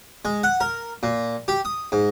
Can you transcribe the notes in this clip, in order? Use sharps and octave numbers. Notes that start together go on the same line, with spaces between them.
G#3
F#5
A#4
A#2
G4
D#6
G#2